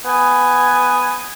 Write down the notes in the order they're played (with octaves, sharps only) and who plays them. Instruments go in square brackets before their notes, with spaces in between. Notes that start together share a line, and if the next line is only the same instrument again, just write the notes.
[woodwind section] B3 G#5